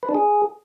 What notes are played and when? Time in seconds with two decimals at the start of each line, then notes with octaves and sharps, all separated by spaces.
0.03 B4
0.09 D4
0.15 G#4